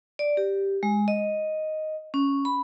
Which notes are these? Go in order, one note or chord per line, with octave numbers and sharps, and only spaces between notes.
D5
G4
G#3
D#5
C#4
B5